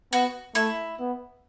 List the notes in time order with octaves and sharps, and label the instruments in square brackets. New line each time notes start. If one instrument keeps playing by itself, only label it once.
[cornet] B3 [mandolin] F#4
[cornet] A3 [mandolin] E4
[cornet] B3